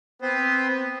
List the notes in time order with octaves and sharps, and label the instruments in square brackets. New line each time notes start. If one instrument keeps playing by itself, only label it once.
[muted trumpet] B3 [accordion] C4 C5